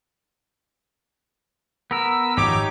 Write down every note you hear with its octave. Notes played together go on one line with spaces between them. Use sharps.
B3 A#4 E6
G#1 F#2 F3 D#4 G4 C#5 D6